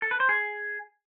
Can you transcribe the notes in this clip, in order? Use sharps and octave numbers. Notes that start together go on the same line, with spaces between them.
A4
B4
C5
G#4